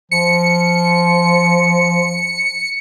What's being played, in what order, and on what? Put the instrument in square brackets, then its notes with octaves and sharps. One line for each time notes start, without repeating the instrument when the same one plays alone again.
[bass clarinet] F3 [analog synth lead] C#7